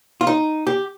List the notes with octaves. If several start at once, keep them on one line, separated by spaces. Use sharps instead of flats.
F4
D#4
G4